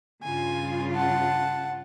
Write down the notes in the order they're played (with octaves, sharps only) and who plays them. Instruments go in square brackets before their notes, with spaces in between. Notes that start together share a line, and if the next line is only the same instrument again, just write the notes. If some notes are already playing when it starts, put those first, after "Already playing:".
[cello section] G2 C#3 F4 [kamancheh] G#5
[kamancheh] F#5 A5